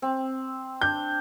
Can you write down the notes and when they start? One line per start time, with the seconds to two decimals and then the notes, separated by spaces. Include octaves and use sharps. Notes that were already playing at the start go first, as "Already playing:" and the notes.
0.02 C4
0.82 D4 G6